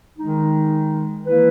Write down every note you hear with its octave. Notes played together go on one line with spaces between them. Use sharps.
D#3 G#3 D#4
E3 A#3 E4 B4